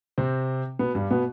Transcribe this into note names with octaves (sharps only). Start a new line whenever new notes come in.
C3 C4
B2 B3
G2 G3
B2 B3